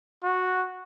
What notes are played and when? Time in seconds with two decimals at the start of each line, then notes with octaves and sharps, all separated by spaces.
0.24 F#4